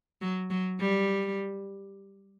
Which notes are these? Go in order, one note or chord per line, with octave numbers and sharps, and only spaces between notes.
F#3
F#3
G3